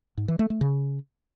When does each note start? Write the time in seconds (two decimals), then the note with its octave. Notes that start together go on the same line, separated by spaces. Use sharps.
0.17 G#2
0.28 E3
0.39 A3
0.50 A3
0.61 C#3